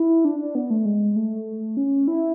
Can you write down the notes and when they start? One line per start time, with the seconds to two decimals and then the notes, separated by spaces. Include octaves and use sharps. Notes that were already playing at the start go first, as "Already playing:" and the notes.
Already playing: E4
0.25 D4
0.39 D4
0.55 B3
0.70 A3
0.85 G#3
1.16 A3
1.77 C#4
2.08 E4